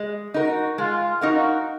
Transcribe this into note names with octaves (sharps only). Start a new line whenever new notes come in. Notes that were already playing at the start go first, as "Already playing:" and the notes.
Already playing: G#3
D#4 F#4 A#4
G#3 F4
D#4 F#4 A#4 F5